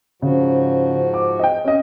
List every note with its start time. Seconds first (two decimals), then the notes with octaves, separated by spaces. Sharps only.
0.22 G#2 C#3 F3 F#4
1.14 D6
1.39 D#5 G5
1.65 C#4 D#5